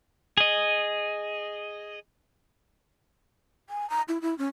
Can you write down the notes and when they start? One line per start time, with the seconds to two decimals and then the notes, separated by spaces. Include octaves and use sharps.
0.37 G#4 D#5
3.69 G#5
3.90 A#5
4.08 E4
4.22 E4
4.38 C#4